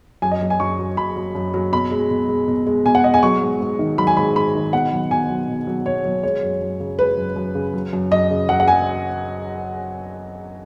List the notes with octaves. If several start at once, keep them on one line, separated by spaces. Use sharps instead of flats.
F#2 G#5
D#5
F#3
G#5
F#2 C#6
F#3
F#2 B5
F#3
F#2
F#3
B2 B5
G#3
B2
G#3
B2
G#3
B2 G#5
F#5
G#3 D#5
G#5
F#3 C#6
G#2
G#2
D#3
F#3 B5
G#5
G#2 B5
G#2 B5
D#3
B2 F#5
F#3
B2 G#5
F#3
B2
F#3
B2 C#5
F#3
G#3 C#5
F#2
F#2
C#3
G#3 B4
F#2
F#2
C#3
F#3
F#2
F#2 D#5
C#3
F#3 F#5
F#5
G#5